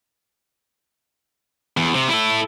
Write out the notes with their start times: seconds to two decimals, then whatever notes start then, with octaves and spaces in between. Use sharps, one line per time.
1.77 E2
1.94 C3
2.09 E4 A4